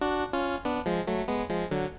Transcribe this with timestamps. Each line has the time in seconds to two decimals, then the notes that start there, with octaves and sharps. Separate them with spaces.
0.01 D4 F#4
0.33 C#4 F4
0.65 B3 D4
0.86 F3 G#3
1.07 F#3 A3
1.28 G#3 B3
1.49 F3 G#3
1.71 D3 F#3